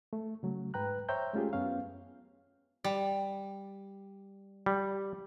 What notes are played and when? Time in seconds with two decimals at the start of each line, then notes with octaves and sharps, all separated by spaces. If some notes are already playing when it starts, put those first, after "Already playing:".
0.13 A3
0.43 C#3 F#3 A3
0.74 G#2 B4 G5 A#5 F#6
1.09 C5 C#5 E5 G5 A#5 G6
1.33 G#3 A3 C#4 F4 G4 G#4
1.53 F#2 B3 C#4 F5
2.84 G3
4.66 G3